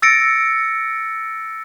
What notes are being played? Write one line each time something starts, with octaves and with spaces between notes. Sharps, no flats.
E6 A6 A#6 C#7 D7